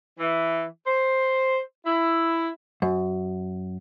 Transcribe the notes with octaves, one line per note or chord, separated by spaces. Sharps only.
E3
C5
E4
F#2